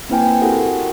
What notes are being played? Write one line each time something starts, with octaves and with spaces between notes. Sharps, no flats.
A#3 C4 E4 B4 G5 G#5
E4 F#4 G4 A4 A#4 F#5